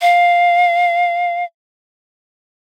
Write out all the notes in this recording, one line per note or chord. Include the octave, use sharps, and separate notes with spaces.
F5